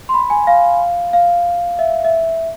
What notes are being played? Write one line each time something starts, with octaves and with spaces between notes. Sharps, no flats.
C6
B5
G#5
F5
F5
E5
E5